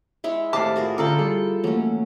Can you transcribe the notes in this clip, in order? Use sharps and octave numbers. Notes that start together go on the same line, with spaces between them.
G#3 E4 C#5 E5
A2 D#3 G4 C5 F5 A5 D6 F6
D#4 F4 F#4 G#4 A#4
D3 C#4 F4 A4 D5 G5 A#5
G3 E4 G4 G#4
E3 F#3 A3 A#3 C#4